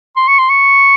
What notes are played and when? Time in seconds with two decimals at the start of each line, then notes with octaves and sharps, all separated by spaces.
0.16 C6
0.28 C#6
0.39 C6
0.50 C#6